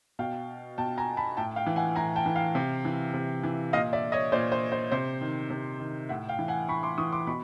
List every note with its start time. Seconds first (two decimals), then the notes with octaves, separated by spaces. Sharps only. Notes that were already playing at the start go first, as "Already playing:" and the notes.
0.19 B2 F5 G5
0.78 B2 G5 A5
0.98 G#5 A#5
1.17 A5 B5
1.37 A2 G5 A5
1.56 F5 G5
1.66 E3
1.76 F#5 G#5
1.96 A2 G#5 A#5
2.16 G5 A5
2.26 E3
2.36 F5 G5
2.55 C3
2.85 E3
3.14 C3
3.43 E3
3.73 A#2 D#5 F5
3.93 D5 E5
4.12 C#5 D#5
4.32 A#2 C5 D5
4.52 C5
4.72 C5
4.91 C3 C5
5.21 D#3
5.50 C3
5.80 D#3
6.09 A2 E5 F#5
6.29 F5 G5
6.39 E3
6.48 F#5 G#5
6.69 A2 B5 C#6
6.83 C6 D6
6.98 E3 C#6 D#6
7.12 C6 D6
7.27 B2 B5 C#6